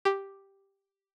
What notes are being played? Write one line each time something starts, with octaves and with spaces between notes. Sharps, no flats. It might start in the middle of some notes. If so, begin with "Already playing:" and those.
G4